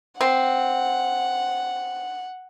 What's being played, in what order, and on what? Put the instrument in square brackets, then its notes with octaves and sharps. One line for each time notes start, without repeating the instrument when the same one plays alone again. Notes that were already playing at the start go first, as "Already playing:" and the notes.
[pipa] C4 [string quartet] F#5